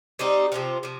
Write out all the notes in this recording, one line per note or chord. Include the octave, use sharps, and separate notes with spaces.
G3 C4 D#4 G4
C3 F3 C4 F4
C3 F3